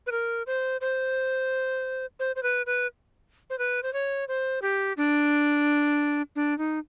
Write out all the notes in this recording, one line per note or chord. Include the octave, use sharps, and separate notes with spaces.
B4
A#4
C5
C5
C5
C5
B4
B4
C5
B4
C5
C#5
C5
G4
D4
D4
D#4